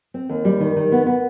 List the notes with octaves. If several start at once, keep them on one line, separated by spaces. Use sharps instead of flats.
C4
D#2
G3
D#3
D#3
B3
B3